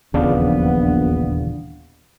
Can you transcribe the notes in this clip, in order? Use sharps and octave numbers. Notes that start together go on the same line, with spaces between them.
D#1 A#1 E2 C#3 B3 D4 F5